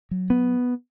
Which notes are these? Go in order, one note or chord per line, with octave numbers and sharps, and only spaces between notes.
F#3
B3